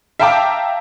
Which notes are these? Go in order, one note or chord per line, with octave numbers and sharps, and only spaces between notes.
E5 F5 G5 A5 A#5 D6